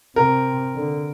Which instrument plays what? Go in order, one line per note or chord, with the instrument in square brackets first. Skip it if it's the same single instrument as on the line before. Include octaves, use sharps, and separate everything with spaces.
[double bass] C3 [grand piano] A#4
[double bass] D3